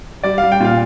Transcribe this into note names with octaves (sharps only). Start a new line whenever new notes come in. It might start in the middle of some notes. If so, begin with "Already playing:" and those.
G3 D5
G3 F5
G5
A#2 F5